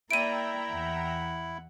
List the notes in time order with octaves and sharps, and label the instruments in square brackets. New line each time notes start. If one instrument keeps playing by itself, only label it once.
[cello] A#3 D5 [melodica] E4 [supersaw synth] E5 G5 A#5 [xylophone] D7 D#7
[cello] E2 F#5